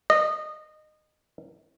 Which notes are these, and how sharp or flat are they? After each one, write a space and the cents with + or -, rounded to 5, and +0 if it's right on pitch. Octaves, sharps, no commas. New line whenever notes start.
D#5 -20